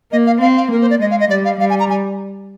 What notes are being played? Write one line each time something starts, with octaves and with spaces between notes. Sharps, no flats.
A#3 D#5
F5
C4 F5
F5
A#3 A#4
C5
D5
G#3 D#5
F5
D#5
G3 D5
F5
G3 F5
G#5
A#5
G#5